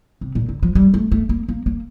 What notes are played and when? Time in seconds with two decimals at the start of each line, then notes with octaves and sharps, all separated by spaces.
0.21 C3
0.35 A#2
0.49 D3
0.63 F3
0.75 G3
0.94 A3
1.12 A3
1.29 A#3
1.49 A#3
1.66 A#3